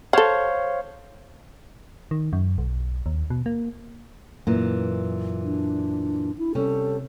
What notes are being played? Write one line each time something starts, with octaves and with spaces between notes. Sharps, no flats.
A4 C5 C#5 F5 F#5
D#3
F#2
B1
D#2
B2
A#3
F#2 A#2 E3
D4
E4
C3 G3 C#4 A4